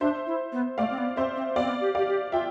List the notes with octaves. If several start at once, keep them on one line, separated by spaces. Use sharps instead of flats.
D4 C5 E5
E4
B3
A3 D5 F5
C4
B3
C4 C5 E5
C4
B3 D5 F5
C4
B3
G4
G4 D5 F5
G4
F4 E5 G5